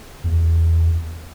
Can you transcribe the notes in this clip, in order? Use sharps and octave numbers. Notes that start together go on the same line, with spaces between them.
E2